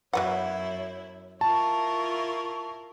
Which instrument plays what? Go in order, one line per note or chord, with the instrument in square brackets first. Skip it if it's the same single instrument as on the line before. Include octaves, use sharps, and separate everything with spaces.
[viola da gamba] F#2 E4 [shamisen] F#3 B3 F#5 [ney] C#5
[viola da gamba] E4 F4 A#4 [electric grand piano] A5 [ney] C#6